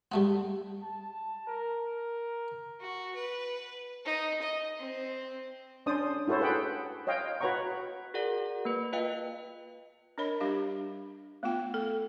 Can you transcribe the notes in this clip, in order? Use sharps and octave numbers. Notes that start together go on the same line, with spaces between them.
G3 A3 B3
A5
A#4
F#4
B4
D#4
D#5
C4
C#4 D4 C5 D5 D#6
E4 F#4 A4 C5 C#5
G#4 B4 F#5 G5
C#5 D#5 F5 G5
F#4 B4 C#5 F#5 A#5 C#6
F#4 G#4 A#4 D5 F#5
A#3 C4 B4
F4 B4 D#5 F5 G5
D4 A#4 C#5 D#5 B5
G3 D4 G4 D#5 F5
A3 B3 F4 G5
A4